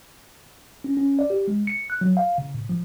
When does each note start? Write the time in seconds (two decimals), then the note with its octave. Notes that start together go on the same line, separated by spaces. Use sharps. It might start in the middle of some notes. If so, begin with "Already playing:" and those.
0.84 C#4
0.97 C#4
1.19 D5
1.30 G4
1.48 G#3
1.67 C#7
1.90 F#6
2.01 F#3
2.17 F5
2.38 C#3
2.54 A2
2.69 F3